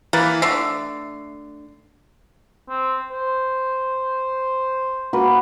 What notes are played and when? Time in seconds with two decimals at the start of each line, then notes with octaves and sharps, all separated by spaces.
0.13 E3 A#3 B4 A6
0.42 D3 A3 C7
2.69 C4
3.12 C5
5.13 A#3 F#4 B4